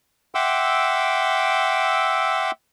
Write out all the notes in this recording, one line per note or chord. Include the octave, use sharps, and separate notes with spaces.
E5 F#5 G5 C6 D6 E6